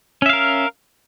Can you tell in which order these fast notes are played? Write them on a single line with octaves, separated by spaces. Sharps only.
C#4 E5 F5 A#4